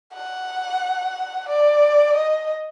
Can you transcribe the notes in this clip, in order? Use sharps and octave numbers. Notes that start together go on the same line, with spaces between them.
F#5
D5
D#5